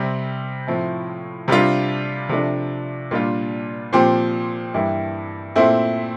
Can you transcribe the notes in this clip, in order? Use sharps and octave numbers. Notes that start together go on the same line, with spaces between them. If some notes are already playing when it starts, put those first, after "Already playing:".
Already playing: C3 G3 C4
A2 F3 C4 E4
C3 G3 D4 F4
C3 F3 A3 D4
A#2 G3 D4 F4
A#2 F3 C4 G4
G2 E3 A#3 E4 G4
A#2 A3 C4 E4